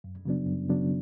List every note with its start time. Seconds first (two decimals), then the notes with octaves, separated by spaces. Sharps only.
0.04 F#2
0.25 C#3 F#3 B3 D4
0.47 F#2
0.69 C#3 F#3 B3 D4